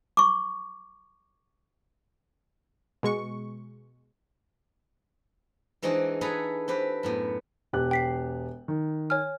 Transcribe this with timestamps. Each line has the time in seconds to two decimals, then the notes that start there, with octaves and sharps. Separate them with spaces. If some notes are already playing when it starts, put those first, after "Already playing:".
0.17 C#6 D6
3.03 B2 G#3 C#6
5.82 E3 G#3 C4 D4 D#4 F#4
6.21 G#4 A4 B4 F#5 G#5 A#5
6.68 C4 G4 B4
7.03 F#2 A2 B3
7.73 E1 G4 F#6
7.91 G5 B6 C7
8.68 D#3
9.10 C#5 G#5 F6